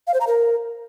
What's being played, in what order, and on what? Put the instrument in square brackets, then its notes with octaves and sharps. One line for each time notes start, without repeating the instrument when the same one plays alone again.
[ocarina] F5
C5
A#5
A#4